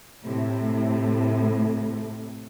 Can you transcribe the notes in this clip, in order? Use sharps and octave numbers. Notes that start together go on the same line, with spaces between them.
A2 C3